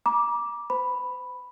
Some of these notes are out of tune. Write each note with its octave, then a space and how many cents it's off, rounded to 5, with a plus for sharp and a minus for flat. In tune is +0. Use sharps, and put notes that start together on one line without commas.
A#5 +40 D6 +0
C5 -35 B5 +0